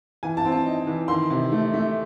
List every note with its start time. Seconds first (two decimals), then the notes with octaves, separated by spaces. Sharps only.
0.23 E3 G#5
0.37 A5
0.45 C4
0.52 A5
0.66 D#4
0.87 E3
1.08 D#3 C6
1.30 C3
1.52 A3
1.73 A3